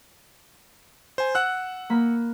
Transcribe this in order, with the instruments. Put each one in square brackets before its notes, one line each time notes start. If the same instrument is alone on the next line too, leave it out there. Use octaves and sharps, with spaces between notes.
[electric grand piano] C5 G#5
F#5 E6 F#6
[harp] A#3 B5